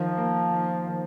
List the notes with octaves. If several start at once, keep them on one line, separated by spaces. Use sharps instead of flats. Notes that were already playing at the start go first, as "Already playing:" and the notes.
Already playing: D#3 F3
A#3
D#3
D#3